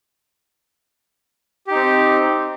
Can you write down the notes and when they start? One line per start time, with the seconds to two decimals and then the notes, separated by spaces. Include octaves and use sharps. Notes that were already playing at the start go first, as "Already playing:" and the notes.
1.67 G4
1.71 D#4
1.75 C4